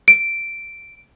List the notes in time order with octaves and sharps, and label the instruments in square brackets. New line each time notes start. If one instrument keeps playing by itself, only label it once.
[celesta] D7